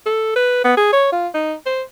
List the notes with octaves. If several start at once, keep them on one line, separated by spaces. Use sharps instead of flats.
A4
B4
B3
G#4
C#5
F4
D#4
C5